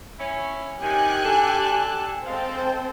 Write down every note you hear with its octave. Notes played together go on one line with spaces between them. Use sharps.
C#4 E4 C#5
C3 D#3 G4 G#5 F#6
D3 D4 A4
G#3 C4 A4 C5 F5